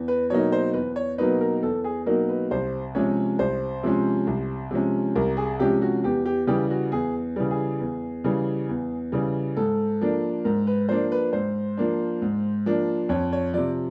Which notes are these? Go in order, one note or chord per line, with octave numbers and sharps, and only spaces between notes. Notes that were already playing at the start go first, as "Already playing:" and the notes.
Already playing: E2
B4
B2 F#3 A#3 D#4 C#5
C5
E2 B4
C#5
B2 F#3 A#3 D#4 B4
A#4
E2 A4
G#4
B2 F#3 A#3 D#4 A#4
B4
C2 C5
C3 F3 G#3 C#4 C#5
C2 C5
C3 F3 G#3 C#4
C2
C3 F3 G#3 C#4
C2 A#4
G#4
C3 F3 G#3 C#4 G4
F#4
E2 G4
G4
C#3 E3 G3 G4
F#4
E2 G#4
C#3 E3 G3
G#4
E2
C#3 E3 G3
E2
C#3 E3 G3
G#2 A4
F3 A#3 D4
G#2 A#4
B4
F3 A#3 D4 C5
B4
G#2 C5
F3 A#3 D4
G#2
F3 A#3 D4
F2 C#5
C#5
C3 F3 D5